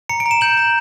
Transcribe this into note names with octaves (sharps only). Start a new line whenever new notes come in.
A#5 C#7
D7
A#5
E7
G6 F#7
A#5